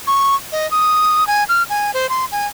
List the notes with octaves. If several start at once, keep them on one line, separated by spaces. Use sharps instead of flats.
C#6
D#5
D#6
G#5
F6
G#5
C5
C6
G#5